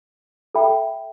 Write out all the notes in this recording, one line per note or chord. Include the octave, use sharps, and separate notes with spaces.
A4 E5 G5 B5